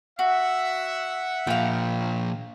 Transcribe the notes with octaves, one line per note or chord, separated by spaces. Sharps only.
F#4 E5 F#5
A#2 F3 F5 G5